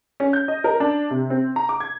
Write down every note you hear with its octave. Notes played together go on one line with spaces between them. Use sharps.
C#4
G6
D#5
A#4
D4
C3
C4
A#5
D6
G#6